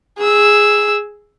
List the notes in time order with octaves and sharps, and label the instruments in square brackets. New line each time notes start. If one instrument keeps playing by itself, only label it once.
[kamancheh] G#4 E6